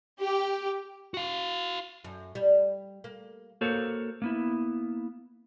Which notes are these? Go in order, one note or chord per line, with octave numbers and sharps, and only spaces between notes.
G4
F#4 F5
F#2
G3
A#3
A#3 F#4 A4 A#4 C5 C#5
A#3 B3 E4